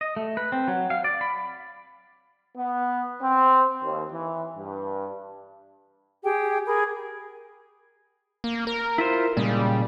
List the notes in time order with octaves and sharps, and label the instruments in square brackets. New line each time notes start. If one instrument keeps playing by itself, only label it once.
[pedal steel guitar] D#5
A3
B4
C4
F#3
F5
D5
B5
[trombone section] B3
C4
D#2
E3
G2
[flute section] G4 G#4 G5
G#4 A#4 B5
[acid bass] A#3
A#4
[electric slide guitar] E4 F4 C5
[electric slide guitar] A#2 C#3 G#3 [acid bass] G3